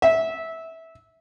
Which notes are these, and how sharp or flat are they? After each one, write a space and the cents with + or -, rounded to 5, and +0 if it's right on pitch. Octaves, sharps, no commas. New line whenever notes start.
E5 -15